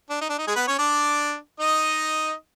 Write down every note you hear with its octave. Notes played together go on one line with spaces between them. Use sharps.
D4
D#4
D4
D#4
G#3 G#4
B3 B4
C#4 C#5
D4 D5
D#4 D#5